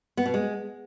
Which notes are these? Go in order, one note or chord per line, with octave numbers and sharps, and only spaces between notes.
B3
B2
G#3